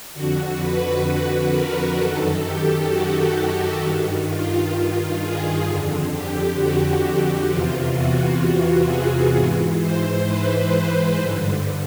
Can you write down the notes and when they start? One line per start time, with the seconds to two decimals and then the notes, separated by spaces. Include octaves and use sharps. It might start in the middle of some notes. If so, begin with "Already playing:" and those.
0.14 F2 D3 F#4
0.59 B4
1.06 B4
1.52 A#4
1.97 F#2 D#3 A4
2.44 G4
2.90 F#4
3.81 G2 D#3
4.27 F4
4.73 F4
5.20 G#4
5.65 F2 D3
6.12 G4
6.57 F#4
7.48 E2 C3 E3 F4
7.95 F#4
8.87 G#4
9.32 G#2 E3
9.79 C5
10.25 B4
11.16 G2 D3